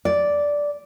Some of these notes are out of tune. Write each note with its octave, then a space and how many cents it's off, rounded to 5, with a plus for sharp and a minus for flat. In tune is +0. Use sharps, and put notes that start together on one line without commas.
D5 -5